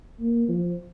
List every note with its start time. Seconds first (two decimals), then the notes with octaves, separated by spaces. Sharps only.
0.20 A#3
0.48 F3